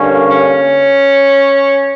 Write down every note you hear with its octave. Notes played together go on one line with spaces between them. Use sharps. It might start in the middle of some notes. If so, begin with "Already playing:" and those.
Already playing: G2 D3 A#3 C#4
C#4